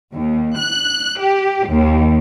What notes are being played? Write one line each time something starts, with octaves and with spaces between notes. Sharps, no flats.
D#2
F#6
G4
D#2